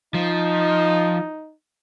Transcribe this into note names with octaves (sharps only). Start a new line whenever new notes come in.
F3 D#4